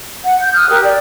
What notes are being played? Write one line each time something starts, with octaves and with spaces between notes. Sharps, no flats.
F#5
G6
D#6 F6 F#6
G4 A#4
D5